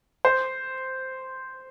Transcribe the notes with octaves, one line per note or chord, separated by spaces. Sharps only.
C5